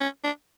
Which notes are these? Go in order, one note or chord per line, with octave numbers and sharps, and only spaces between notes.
C#4
D4